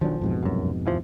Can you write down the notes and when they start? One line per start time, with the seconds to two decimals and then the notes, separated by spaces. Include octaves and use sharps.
0.01 B1 D#3 F3 F#3 D4
0.21 F2 G#2 B2
0.43 C2 F#2
0.86 D#2 E3 F3